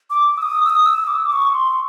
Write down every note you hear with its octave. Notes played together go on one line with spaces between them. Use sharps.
D6
E6
D#6
E6
D#6
E6
D6
D6
C#6
C#6
C6